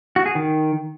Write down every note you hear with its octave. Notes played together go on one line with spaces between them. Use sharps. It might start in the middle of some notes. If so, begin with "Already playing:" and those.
F#4
G#4
D#3